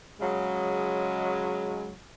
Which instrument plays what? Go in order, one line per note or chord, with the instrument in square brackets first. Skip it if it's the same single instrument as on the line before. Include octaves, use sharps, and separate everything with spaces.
[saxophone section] C#3 F#3 G#3